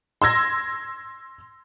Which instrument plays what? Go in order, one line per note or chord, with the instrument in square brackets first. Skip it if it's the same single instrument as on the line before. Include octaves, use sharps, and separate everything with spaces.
[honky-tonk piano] C6 E6 G#6 A#6